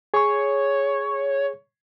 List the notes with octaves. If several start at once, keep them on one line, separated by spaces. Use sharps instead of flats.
G#4 C#5 C#6